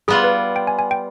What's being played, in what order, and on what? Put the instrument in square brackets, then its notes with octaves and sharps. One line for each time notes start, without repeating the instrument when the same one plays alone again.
[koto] G3 B3 F4 [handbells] G#4
[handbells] B4
G5
G#5
G#5
G5